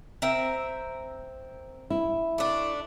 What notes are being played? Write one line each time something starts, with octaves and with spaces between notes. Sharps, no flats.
C4 A#4 E5
E4
A3 D4